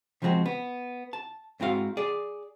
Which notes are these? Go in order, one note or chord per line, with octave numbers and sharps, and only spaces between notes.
C#3 F3 G#3 B3 C4 F#4
B3
A5
G#2 C4 E4 F#4 F5
G#4 D5